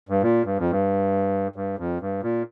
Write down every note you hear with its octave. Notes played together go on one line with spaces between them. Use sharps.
G2
A#2
G2
F2
G2
G2
F2
G2
A#2